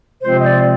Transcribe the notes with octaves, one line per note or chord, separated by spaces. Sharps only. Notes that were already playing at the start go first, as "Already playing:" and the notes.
C3 F3 G#3 C4 F4 C5
D#5
D5